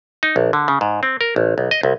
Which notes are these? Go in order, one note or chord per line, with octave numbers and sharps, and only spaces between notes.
D#4
A#1
D3
C#3
G#2
C4
A#4
A1
B1
D#5
C2